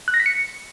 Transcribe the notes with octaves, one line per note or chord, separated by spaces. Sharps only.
F#6
A#6
B6
C#7